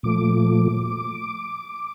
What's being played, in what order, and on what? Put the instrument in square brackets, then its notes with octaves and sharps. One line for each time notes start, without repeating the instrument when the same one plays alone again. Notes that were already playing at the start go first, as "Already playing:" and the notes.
[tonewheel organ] A#2 F3 A3 D6